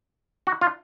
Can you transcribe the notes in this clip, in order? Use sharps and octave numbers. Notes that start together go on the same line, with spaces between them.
F#4
F4